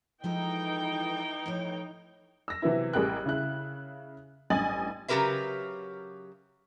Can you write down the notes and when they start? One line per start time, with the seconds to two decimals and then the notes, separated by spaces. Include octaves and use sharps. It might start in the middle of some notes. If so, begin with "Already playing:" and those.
0.24 E3 F3 G#3 D#4 A4 G5
1.46 A2 F3 C#5
2.48 E6 A#6
2.62 C3 E3 F#3 B3 E4
2.93 A1 G3 G#4 A#4 G5 F#6
3.26 C#3 E4 F#6
4.50 A1 G2 D#5 G#5 A6 F#7
5.08 C#3 F#3 G4 A#4 B4 E5